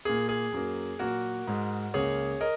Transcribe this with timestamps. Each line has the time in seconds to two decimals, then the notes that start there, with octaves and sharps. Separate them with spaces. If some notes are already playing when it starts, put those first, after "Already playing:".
0.05 A#2 A#3 G#4
0.29 G#4
0.52 F#2 F#3 A#3
0.99 A#2 F#3 A#3 F#4 A#4
1.47 G#2 G#3
1.94 C#2 C#3 A#3 G#4 C#5
2.41 A#4 D#5